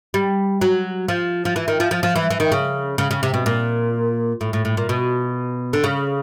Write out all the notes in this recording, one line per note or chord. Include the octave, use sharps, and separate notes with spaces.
G3
F#3
F3
F3
E3
D#3
F3
F3
F3
E3
E3
D#3
C#3
C#3
C#3
C3
B2
A#2
A2
A2
A2
A#2
B2
D3
C#3